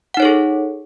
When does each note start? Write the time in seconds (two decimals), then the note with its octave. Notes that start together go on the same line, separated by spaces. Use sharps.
0.14 F#5
0.17 D#4
0.20 C#5
0.22 A4
0.25 G#4